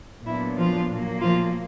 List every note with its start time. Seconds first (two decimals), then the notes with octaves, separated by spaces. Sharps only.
0.25 A#2 F#3 B3 D4 E4
0.57 F3 F4
0.90 A#2 F#3 A#3
1.22 F3 F4